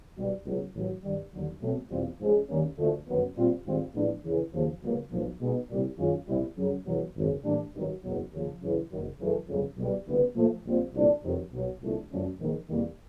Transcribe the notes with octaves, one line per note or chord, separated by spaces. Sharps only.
B1 B2 G3
C#2 B2 F#3
A1 A2 F#3
G2 D#3 G3
D#2 D3 F#3
B2 F#3 A3 C4
E2 B2 G3 C4 F4
G#2 F3 G#3 C#4
D#2 D#3 G3 A#3 C#4
D2 D3 F3 A3
G1 F#2 D#3 F#3 B3
A#2 G3 C4 F4
G#2 D#3 G3 C4 F4
A2 F3 G#3 B3 D4
E2 C#3 E3
D#2 C#3 F3
C#2 B2 F#3 A#3
B1 A#2 F3
B2 G#3 B3 D#4
C2 A#2 G3
F#2 D#3 G#3 C#4 F4
C2 B2 G3 C4 E4
F#2 C#3 F#3
E2 B2 F#3
G#1 F#2 C#3
A2 E3 G3 A#3 D4
G#1 G2 D#3 F#3
F#1 E2 B2 F#3 B3
D#2 C#3 F3
F#2 C#3 E3
F#1 F#2 D#3 F#3
F#2 C#3 E3 A3
G1 F2 C#3 F#3
B1 B2 G3
D2 C#3 E3 G3 B3
A#2 F3 A3
A#1 A#2 G3 C4 F4
C2 A#2 F3 A3 D4
F2 C3 D#3 F#3
B1 B2 F#3
C2 A#2 F3 A3 D4
F#2 D3 F3 A3 C#4
A#1 G#2 D#3
E2 C3 D#3 G3 A#3